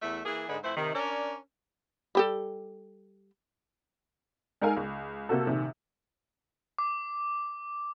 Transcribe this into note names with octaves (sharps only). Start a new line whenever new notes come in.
E2 A3 E4 E5
E3 A#3 G#4
G#2 D3 D#4 G#4 B4
F2 A3 E4 C5
C3 D#3
C#4 D4 A#4 C#5 D5
G3 G4 A4
G#3 D#4 A4 A#4 F5 G#5
C#2
C3 A#3 F#4 A4
A#1 C3 D#3
D6